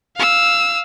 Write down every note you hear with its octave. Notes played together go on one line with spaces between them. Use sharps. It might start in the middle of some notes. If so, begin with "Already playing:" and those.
F5 E6